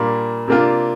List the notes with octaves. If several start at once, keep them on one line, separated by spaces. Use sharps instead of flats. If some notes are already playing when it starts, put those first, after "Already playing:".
Already playing: A#2 G3 A#3 D4
C3 A#3 D4 F4